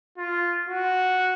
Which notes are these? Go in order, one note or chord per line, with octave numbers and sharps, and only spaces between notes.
F4
F#4